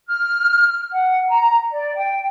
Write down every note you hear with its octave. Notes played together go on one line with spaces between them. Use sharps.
F6
F#5
A#5
D5
G5